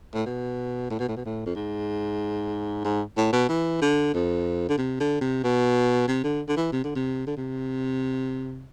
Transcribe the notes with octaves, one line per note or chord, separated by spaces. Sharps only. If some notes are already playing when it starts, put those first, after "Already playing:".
A2
B2
A2
B2
A2
B2
A2
F2
G#2
G#2
A2
B2
E3
D3
F2
D3
C3
D3
C3
B2
C3
D3
D3
E3
C3
D3
C3
D3
C3